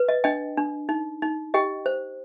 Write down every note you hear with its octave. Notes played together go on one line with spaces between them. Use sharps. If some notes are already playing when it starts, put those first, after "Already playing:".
Already playing: B4
D#5
D4 D#5 G5
D4
D#4
D#4
G4 D#5 G5
C5